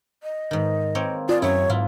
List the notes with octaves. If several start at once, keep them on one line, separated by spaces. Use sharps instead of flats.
D#5
G#2 D#3
A#3 C4 C#5
F4 G#4 D5
F#2 F#3 E4 C#5
G#2 E4 F4